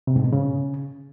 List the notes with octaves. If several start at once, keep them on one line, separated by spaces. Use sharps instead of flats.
C3
G#2
B2
C#3